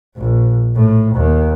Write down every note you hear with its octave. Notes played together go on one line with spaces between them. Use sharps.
A#1
A2
D#2